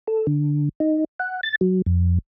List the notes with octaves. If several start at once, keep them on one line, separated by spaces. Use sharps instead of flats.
A4
D3
D#4
F#5
A6
F#3
F2